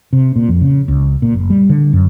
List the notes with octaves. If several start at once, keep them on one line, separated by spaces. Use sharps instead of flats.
C3
A#2
F2
C#3
C#2
A#2
F#1
G3
D3
F#2